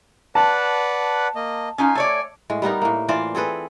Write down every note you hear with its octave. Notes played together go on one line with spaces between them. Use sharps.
B4 D5 F#5 A5
A#3 D#5
C#4 D#4 F4 G#5
A3 C#5 D5
A2 G#3
G3 B3 D#4 A#4
A2 A#3
E3 F4 C5 D5
C4 G#4 A4 B4